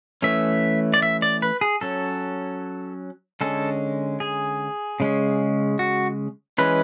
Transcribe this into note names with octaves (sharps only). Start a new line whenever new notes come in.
E3 A3 C#4 E5
D5
E5
D5
B4
G#4
F#3 C#4 A4
D3 G#3 C#4 A4
G#4
C#3 G#3 C#4
F#4
E3 G#3 C#4 B4